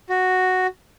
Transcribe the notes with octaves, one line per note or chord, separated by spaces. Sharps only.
F#4